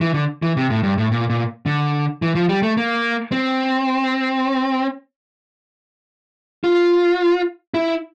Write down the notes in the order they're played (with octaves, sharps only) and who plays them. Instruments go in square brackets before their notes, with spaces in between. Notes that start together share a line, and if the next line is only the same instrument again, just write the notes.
[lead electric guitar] E3
D3
E3
C3
A2
G2
A2
A#2
A#2
D3
E3
F3
G3
A3
A#3
C4
F4
E4